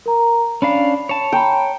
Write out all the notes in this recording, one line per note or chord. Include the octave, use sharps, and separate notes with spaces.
A#4 A#5
C#4 D4 F5 B5
C#5 A5
G5 A#5 B5